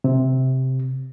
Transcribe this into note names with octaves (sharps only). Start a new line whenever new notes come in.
C3